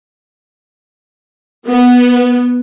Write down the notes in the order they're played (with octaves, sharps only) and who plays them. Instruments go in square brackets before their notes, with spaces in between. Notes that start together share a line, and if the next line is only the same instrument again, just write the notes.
[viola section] B3